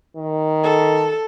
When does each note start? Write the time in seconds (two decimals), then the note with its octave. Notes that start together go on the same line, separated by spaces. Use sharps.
0.17 D#3
0.64 A4